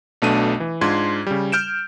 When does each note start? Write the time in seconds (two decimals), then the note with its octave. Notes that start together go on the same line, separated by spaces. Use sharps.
0.22 B1 B2 A3 D4 D#7
0.60 E3
0.81 G#2 D4 F4 C6 G#6
1.27 C#3 G3
1.52 F6 G6 D7 E7